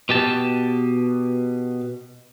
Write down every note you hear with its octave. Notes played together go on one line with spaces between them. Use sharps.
B2 G4 A5